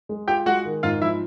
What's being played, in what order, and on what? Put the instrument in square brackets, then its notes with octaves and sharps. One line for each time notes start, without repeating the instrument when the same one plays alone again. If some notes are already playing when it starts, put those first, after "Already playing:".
[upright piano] G#3
[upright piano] F4 [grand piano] G4 G5
[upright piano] G#3 [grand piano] F#4 F#5
[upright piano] D#3
[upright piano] G#2 [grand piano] F4 F5
[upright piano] F3 [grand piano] E4 E5